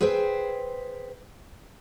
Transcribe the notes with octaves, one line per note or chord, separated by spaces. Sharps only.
G#4 B4 C5 E5 G5